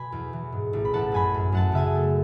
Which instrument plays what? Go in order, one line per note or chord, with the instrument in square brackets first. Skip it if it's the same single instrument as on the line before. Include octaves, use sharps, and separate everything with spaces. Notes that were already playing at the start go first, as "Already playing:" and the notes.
Already playing: [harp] B2 G#5 B5
E2
E3
G#2
A1
B5
A1 F#5 A5
F#2 G#5 B5
F#2
F#2 F#5 A5
C#3 E5 G#5
A3